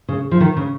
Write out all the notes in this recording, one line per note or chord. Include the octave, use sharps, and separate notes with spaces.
C#3
F3
D#3
C#3